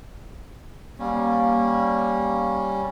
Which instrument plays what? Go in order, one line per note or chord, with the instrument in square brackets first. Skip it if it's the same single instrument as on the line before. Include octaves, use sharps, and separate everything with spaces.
[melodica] G3 C#4 [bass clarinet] A#3